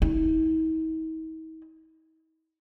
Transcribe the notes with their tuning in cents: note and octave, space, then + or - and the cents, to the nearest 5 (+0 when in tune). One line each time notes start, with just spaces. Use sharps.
D#4 +45